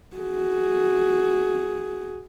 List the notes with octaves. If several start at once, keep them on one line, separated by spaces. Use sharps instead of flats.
F#4 G#4